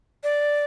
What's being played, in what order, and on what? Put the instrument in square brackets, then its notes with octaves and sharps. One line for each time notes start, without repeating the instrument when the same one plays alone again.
[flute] D5